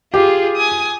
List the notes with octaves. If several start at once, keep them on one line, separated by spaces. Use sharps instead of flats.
F4 G4 G#4
G#5 D#6